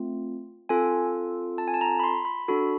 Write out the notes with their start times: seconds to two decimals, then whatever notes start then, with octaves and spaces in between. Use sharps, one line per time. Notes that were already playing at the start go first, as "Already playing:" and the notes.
Already playing: A3 C4 F4
0.69 C4 F4 A4 G#5
1.58 A5
1.68 G#5
1.74 A5
1.81 A#5
1.99 B5
2.04 C6
2.25 B5
2.48 D4 F#4 A4 B5